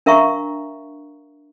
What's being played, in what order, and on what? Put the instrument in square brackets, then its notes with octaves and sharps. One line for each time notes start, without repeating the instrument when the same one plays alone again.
[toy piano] D4 A#4 E5 F5 A#5 C#6